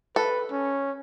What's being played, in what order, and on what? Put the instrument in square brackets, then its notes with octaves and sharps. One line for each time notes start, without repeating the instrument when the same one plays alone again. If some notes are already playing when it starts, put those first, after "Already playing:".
[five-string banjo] A4 [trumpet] B4
[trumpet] C#4